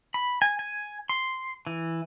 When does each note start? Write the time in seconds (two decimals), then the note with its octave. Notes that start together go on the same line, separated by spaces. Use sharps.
0.14 B5
0.42 G#5
0.59 G#5
1.09 C6
1.67 E3